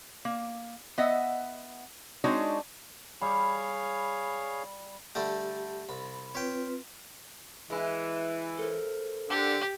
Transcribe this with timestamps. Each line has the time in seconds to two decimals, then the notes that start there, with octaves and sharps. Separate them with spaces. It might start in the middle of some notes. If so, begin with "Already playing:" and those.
0.25 A#3
0.98 B3 D#5 E5 F#5
2.24 G#3 C4 D4 D#4 F#4 C#5
3.21 G3 G#4 C#5 F5
5.15 D3 G3 A3 G4
5.89 C2 B5
6.35 C4 F4 B4 C#5 G5
7.70 E3 G#3 E4
8.59 A4 A#4 C5
9.30 D3 D4 G4